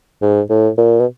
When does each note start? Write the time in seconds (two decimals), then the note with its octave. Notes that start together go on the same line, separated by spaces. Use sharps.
0.22 G#2
0.50 A2
0.78 A#2
1.00 B2